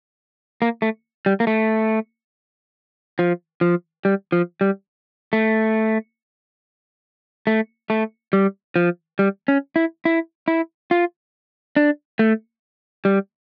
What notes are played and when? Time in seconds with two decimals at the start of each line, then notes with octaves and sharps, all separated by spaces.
0.62 A#3
0.82 A3
1.26 G3
1.40 A#3
1.47 A3
3.19 F3
3.61 F3
4.05 G3
4.32 F3
4.61 G3
5.33 A3
7.47 A3
7.90 A3
8.33 G3
8.76 F3
9.19 G3
9.48 C#4
9.76 E4
10.05 E4
10.48 E4
10.91 F4
11.76 D4
12.19 A3
13.05 G3